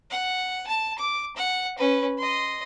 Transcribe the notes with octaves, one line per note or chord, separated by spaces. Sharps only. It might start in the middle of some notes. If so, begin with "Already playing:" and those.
F#5
A5
D6
F#5
C#4 B4
D#5 C6